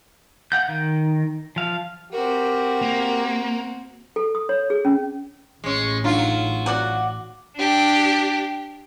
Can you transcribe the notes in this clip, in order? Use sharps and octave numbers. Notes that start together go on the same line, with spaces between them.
F5 F#5 G6
D#3
F3 F5
C4 F#4 G4 A#4
A#3
A4
D#6
C#5
G#4
C#4
A1 G#3 C#4
F#3 D4 D#4 F4
F#4 D5 F#5
D4 G4